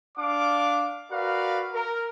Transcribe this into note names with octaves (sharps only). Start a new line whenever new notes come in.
D4 F5 D6
F#4 A#4 B4 D5 F5
A#4